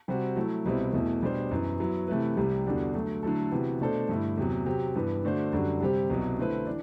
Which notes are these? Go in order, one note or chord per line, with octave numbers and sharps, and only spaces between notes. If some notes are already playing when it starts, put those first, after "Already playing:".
C3 G3 C4 F#4
F#3 A3 E4
C2 B2 G3 C4 E4
E2 B2 A3 E4
B2 G3 D4 G4 C5
F#2 E3 B3
F#3 B3 E4
C3 E3 A3 E4 B4
C2 C3 G3
E2 D3 G3 D4 F#4
D3 F#3 A3
D3 F#3 A3 E4 A4
C3 E3 B3 F#4
B2 A3 D4 A4 C5
G2 D3 A3 E4
E2 C3 F#3
C3 F#3 C4 G4
G2 E3 B3
D3 A3 D4 F#4 C5
F#2 D3 G3 D4 F#4
C3 G3 C4 G4
C2 B2 F#3
D3 A3 C4 E4 B4
E3 D4